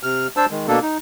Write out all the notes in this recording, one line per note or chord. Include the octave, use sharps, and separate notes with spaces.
C3 F6
D4 C5 A5 E6
D#3 G#3
B2 A#3 D4 A4
D#4